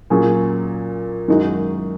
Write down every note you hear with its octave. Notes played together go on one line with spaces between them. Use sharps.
A#2 F#3 C#4 G#4
F#2 D#3 G#3 D#4 F#4